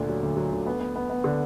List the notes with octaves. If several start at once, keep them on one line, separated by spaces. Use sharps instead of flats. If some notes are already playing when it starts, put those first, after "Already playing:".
Already playing: D2 A#2 D3
F#3
D2
F#3
D2
B3
B3
B3
B3
D3